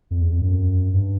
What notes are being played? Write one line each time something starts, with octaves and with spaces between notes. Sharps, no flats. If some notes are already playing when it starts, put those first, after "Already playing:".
F2
E2
F2
F#2
G2